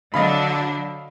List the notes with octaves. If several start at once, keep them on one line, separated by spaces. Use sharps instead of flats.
D3 F#3 D4 D#5 F5 B5